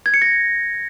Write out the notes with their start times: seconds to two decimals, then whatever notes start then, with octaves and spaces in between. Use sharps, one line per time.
0.06 G#6
0.14 C#7
0.22 A#6